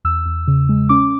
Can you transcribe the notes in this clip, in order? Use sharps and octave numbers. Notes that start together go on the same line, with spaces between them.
E2 E6
E2
C#3
G#3
C#4 D6